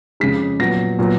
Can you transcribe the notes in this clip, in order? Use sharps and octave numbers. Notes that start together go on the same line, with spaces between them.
F2 C#3 G#3 B6
A#2 F#3 B3 A#6
A#2 F#3 B3